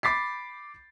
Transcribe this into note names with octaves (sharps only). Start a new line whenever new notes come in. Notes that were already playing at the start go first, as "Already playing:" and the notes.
B5 D6 A6 B6 C7